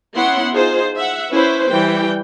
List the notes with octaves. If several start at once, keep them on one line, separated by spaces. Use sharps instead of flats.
B3 C#4 E4 F#5 C6
D#4 F4 G#4 C5
E5 F#5
C#4 E4 B4 C5
E3 G3 G5